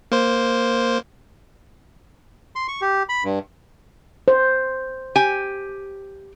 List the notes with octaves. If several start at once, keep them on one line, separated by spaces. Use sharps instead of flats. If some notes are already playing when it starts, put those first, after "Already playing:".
A#3 C5
C6
C#6
G4
B5
G2
C5
G4 G#5